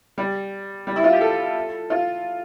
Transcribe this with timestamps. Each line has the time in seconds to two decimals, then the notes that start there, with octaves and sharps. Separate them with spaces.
0.18 G3
0.87 G3
0.96 E4
1.04 F4
1.13 G4
1.21 A4
1.90 F4